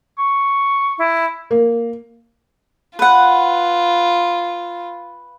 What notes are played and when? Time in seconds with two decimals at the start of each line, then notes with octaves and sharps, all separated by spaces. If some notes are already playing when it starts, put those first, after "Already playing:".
0.18 C#6
0.98 E4
1.51 A#3
2.99 F4 B4 F#5